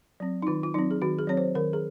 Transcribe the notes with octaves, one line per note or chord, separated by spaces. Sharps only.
F#3 C4
D#4
D#3 F4
F4
F#3 C4 D#4
G#4
D#3 F#4
G#4
F#3 C4 C#5
C5
D#3 A#4
G#4